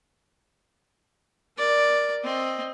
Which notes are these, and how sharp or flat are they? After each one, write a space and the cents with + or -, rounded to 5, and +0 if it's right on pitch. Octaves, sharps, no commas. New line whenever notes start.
A#4 +10 D5 +0
C4 +10 D#5 +0